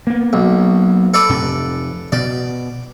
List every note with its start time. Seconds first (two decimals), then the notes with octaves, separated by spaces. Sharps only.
0.07 A#3 B3
0.33 B1
1.14 A4 B4 D5
1.29 F2 C3
2.12 B2 D5